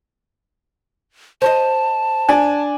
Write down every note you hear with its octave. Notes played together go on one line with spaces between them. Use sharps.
C5 C#5 D#5 A5
D4 G#5